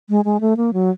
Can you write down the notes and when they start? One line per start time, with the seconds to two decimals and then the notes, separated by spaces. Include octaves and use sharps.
0.09 G#3
0.25 G#3
0.41 A3
0.57 A#3
0.73 F#3